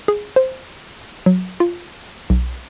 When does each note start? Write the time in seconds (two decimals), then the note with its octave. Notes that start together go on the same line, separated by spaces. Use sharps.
0.08 G#4
0.36 C5
1.26 F#3
1.60 F4
2.30 B1